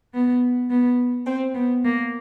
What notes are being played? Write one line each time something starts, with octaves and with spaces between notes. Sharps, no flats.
B3
B3
C4
B3
A#3